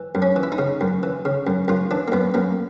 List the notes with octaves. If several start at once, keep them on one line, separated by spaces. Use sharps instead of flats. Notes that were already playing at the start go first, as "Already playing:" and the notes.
Already playing: E3
F#2
C#4
E3
E4
D#4
C#3
F#2
E3
C#3
F#2
F#2 F4
E3 D4
A#3
F#2 B3
F#2 A#3